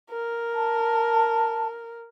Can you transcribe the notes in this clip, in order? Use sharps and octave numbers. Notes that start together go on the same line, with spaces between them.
A#4
A5